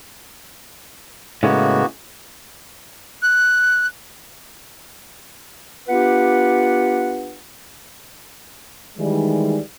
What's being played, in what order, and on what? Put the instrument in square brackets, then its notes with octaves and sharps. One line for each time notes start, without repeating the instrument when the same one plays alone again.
[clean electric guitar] A2 C#3 G#3 [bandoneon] A#3 B3 F#4
[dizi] F#6
[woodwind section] B3 D4 F4 G4 B4 F#5
[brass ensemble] D#3 E3 G3 G#3